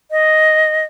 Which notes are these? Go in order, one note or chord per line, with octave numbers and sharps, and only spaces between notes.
D#5